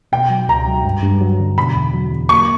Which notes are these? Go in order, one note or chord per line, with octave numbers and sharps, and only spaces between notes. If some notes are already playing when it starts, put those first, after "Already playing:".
B2 G5
F#3
C#2 A#5
F#3
G2
G2
F#3
D3
B2 B5
E2
F#3
E2
A#3 C#6